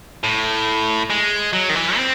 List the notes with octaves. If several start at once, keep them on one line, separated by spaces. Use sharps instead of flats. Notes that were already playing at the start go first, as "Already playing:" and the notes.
A2
G#3
F#3
D#3
E3
C4